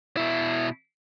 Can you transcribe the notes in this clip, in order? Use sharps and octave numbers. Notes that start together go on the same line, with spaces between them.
B2 E4